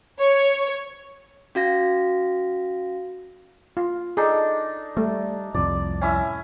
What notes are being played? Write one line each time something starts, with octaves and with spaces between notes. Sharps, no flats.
C#5
C#4 F#4 F5 A#6
F4
D4 D#4 G#4 A4
G3 A3
C2 F2 A2 D5
C#4 E4 E5